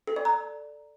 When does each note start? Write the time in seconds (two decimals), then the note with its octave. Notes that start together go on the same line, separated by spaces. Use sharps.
0.07 A4
0.16 D5
0.25 A#5